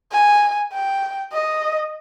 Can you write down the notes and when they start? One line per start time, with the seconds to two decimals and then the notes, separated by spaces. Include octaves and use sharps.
0.12 G#5
0.73 G5
1.33 D#5